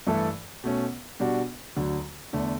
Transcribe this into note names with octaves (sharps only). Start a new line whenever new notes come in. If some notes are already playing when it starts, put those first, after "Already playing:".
G2 E3 A3 E4 A4
B2 A3 C#4
B2 G3 D4 F#4
D2 D3 F#3
E2 D3 A3